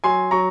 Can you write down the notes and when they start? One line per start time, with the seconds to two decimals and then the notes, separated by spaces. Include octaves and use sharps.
0.04 F#3 G#5 C6
0.31 F#3 A#5 C#6